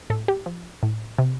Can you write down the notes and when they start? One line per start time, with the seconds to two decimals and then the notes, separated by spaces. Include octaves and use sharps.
0.10 A2 A4
0.28 G4
0.46 F3
0.83 A2
1.18 C3